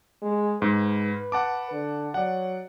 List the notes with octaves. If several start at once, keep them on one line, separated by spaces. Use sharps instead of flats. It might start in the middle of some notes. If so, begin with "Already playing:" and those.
G#3
G#2 B4
F#5 A5 D6
D3
F#3 D5 F#5